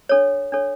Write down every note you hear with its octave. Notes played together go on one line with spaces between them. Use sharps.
D4 A4 C#5
D4 A4 C#5